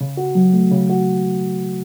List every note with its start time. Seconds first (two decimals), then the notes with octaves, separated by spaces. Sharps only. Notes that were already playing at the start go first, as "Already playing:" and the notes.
0.01 C#3
0.17 F#4
0.35 F#3
0.53 A3
0.72 C#3
0.90 F#4